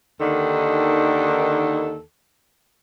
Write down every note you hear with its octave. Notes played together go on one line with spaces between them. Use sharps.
D#2 D3 D#3 A4